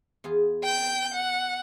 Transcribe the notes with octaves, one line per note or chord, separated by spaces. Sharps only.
E2 F4 G#4
G5 G6
F#5